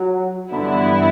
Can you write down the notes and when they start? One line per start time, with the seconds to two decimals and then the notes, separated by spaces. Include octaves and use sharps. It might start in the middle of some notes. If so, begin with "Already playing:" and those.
Already playing: F#3
0.52 G2 D3 E3 B3 E4